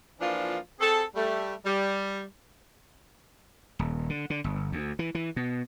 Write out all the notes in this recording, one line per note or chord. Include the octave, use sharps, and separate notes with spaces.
E3 F3 A#3 D4 F4
C4 G#4 A4
G3 A3
G3
D#1
D3
D3
G1
D2
E3
E3
B2